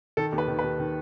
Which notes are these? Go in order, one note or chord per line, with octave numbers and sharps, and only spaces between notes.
D#3 A4
D#2
B4
D#3
D#2 B4
D#3